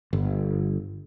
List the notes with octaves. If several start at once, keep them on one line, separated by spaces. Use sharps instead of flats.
G1